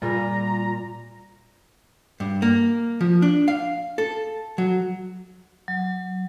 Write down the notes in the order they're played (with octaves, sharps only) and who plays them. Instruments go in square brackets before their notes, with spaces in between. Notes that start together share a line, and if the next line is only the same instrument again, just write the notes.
[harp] A#2 A#4 [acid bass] G3 [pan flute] F4 [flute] A#5
[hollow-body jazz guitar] G2
A#3
F3
D4
F5
A4
F#3
[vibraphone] F#3